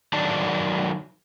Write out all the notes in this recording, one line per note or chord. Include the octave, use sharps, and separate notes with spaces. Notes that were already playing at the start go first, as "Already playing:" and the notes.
D#3 F#3 D#4 D5 A5